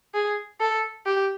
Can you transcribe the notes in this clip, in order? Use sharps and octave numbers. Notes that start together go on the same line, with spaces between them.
G#4
A4
G4